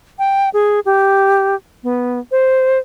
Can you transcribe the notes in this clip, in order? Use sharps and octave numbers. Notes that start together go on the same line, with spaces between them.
G5
G#4
G4
B3
C5